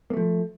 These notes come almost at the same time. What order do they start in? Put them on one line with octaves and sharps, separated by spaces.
A#3 A3 F3